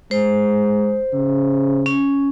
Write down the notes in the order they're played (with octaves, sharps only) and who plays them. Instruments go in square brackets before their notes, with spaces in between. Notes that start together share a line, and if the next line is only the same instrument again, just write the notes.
[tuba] G#3 [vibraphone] C5
[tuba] C#3
[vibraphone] C#4